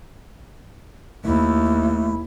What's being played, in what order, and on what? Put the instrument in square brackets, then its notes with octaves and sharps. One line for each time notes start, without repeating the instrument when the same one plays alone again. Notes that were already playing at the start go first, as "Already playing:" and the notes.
[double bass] D#2 [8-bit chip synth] A3 [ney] E4